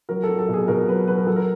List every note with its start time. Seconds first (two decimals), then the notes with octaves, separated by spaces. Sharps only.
0.09 F#3 A#4
0.23 A4
0.29 F#3
0.39 A4
0.48 B2
0.53 G#4
0.68 B2 A#4
0.88 F#3 B4
1.08 F#3 B4
1.18 A#4
1.27 F#3 A4
1.36 A#4